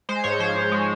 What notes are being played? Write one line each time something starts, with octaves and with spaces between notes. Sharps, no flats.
G#3 C5
G#2 C#5
F3 C5
G#2
G#3